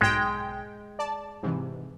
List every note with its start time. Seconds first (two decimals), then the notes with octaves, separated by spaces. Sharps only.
0.01 B1 G#2 G#3 G5
0.99 D5 A5
1.43 G#2 C3 E3